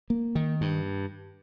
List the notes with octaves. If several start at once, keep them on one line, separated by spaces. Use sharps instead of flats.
A#3
D#3
G2